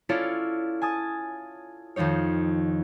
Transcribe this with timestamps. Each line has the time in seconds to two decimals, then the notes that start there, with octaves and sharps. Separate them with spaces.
0.09 C#4 E4 F4 A4 C#5 D5
0.82 G#5 A5 D#6
1.96 F2 D#3 F3 D#4 C#5